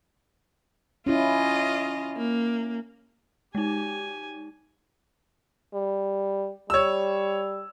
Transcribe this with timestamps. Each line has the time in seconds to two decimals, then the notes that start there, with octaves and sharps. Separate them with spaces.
1.06 C#4 E4 F4 D#5
2.17 A#3
3.55 G#3 D#4 G4 G#5
5.74 G3
6.70 G3 C#5 E6